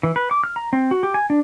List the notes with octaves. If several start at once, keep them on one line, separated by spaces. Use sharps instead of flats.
E3
B4
D6
F6
A#5
C4
F#4
G4
G#5
D4